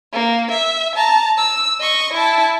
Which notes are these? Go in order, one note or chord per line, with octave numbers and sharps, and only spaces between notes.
A#3
E5
A5 A#5
E6
D#5 C#6
E4 A5